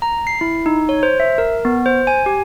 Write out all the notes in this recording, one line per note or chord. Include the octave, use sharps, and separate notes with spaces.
A#5
C7
E4
D#4
C#5
C5
E5
A#4
B3
C5
G#5
G4